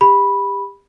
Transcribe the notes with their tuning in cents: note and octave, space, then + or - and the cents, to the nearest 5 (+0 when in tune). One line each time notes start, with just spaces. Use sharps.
G4 +30 B5 -5